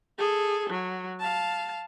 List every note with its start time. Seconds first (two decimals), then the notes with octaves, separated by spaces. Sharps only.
0.18 G#4 A4
0.70 F#3
1.20 F5 A5